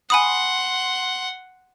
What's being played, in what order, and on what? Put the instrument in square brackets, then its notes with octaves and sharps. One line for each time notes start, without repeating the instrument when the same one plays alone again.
[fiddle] F#5 C6 [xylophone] G#5 B5 D#6